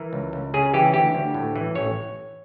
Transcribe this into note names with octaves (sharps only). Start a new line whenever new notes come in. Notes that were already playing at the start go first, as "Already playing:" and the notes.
Already playing: E3 A#4
C#2
C#2
C#3 G#4
E3 G4
D2 G4
D2
A2
E3
A1 C#5